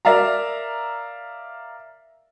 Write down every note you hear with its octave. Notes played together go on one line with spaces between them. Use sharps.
A#4 D5 E5 F5 A#5